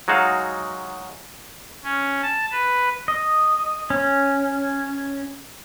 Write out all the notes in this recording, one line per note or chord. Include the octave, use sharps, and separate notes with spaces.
F#3 G#3 D#4 F#4 F5
C#4
A5
B4
D#5
C#4